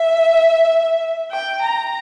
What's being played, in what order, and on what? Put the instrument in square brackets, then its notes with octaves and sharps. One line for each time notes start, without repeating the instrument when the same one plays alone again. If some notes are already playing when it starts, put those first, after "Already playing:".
Already playing: [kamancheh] E5
G5
A#5